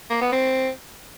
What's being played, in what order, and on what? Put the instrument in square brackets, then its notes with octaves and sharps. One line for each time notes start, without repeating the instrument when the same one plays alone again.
[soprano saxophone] A#3
B3
C4